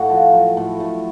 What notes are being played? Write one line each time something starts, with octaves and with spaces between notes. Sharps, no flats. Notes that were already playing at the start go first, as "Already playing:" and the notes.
Already playing: A2 F#4
F3
F#3
A2
A2